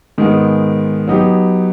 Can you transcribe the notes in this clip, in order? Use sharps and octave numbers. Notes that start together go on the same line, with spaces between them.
G#2 D#3 G#3 B3
F#3 B3 D#4 G4